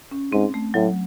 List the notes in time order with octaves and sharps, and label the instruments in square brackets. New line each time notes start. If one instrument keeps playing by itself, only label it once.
[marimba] C#4
[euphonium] G#2 [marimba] C4
[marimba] A3
[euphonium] A2 [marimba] F#3